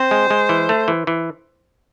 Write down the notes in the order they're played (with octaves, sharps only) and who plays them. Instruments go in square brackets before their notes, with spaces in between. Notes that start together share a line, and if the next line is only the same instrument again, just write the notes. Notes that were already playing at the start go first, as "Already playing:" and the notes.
Already playing: [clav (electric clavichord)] C4 [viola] C5
[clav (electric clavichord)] G#3
G#3
E3
A3
E3
E3